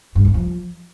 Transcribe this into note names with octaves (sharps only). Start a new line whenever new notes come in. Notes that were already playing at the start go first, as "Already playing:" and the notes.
G2
E2
F3